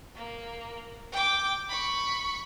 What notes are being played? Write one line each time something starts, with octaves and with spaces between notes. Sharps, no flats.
A#3
G5 D6
B5 C#6